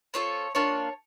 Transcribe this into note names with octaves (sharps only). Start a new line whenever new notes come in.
C4 F4 A4 C#5
A#3 D4 F4 C#5